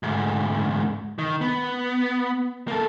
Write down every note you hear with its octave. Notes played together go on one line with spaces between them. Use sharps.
D2 G#2
D#3
B3
A#3 A4